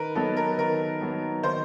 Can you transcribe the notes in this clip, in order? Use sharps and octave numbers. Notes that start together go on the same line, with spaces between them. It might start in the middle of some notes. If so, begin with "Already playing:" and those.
Already playing: D#3 A#4 B4
F#3 B3 D#4 A4
A#4
D#3 A#4
F#3 B3 D#4
D#3 C5